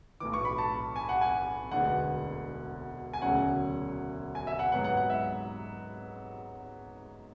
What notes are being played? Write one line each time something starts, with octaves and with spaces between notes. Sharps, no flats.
B1 A2 E3 D6
C#6
B5
A5
G#5
F#5
G#5
E1 D2 D3 G#3 B3 F#5
G#5
E1 D2 C#3 F#3 C#4 F#5
G#5
E5
F#5
G#2 F#3 B3 F#5
F#5
F#5
E5